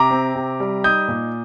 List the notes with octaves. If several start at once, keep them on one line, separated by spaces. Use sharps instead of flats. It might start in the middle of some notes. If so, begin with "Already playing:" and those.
Already playing: C3 A#5 D6
C4
C3
G3
D#4 D#6 G6
A#2